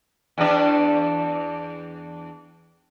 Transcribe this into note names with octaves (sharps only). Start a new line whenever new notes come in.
E2 D4